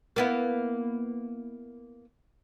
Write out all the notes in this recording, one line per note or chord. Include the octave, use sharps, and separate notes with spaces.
A#3 B3 E4